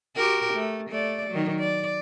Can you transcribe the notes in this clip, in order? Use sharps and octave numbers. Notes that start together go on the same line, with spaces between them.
F#4 G4 A#4
A3
A3 D5
D#3 F#3
D5